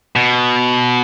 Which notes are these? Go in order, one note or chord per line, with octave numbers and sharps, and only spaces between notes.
B2